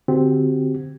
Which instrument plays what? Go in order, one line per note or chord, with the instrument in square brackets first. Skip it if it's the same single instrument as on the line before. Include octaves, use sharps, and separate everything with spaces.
[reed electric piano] D3 C4 F#4 G4